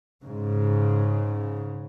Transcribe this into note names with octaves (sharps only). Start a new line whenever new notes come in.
G#2 C#3